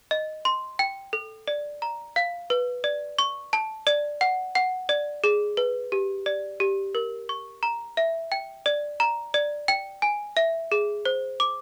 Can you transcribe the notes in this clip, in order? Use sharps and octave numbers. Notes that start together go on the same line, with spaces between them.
D#5
C6
G5
A4
D5
A#5
F5
B4
D5
C#6
A5
D5
F#5
F#5
D5
G#4
B4
G4
D5
G4
A#4
C#6
A#5
E5
G5
D5
A#5
D5
G5
G#5
E5
G#4
C5
D6